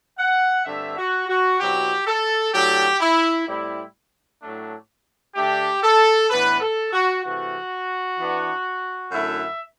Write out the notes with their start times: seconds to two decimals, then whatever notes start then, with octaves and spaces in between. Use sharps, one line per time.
0.18 F#5
0.65 G2 D3 A3 C4 E5
0.96 F#4
1.28 F#4
1.60 B2 F#3 C4 E4 G4
2.07 A4
2.53 A2 F#3 A3 D4 G4
3.01 E4
3.48 A2 G3 C4 E4
4.41 A2 F#3 A3 D4
5.35 D3 A3 D4 G4
5.83 A4
6.29 A2 E3 B3 D4 B4
6.61 A4
6.93 F#4
7.24 C3 E3 A3 F#4
8.18 E3 B3 D4
9.11 F#2 D3 A3 E4 E5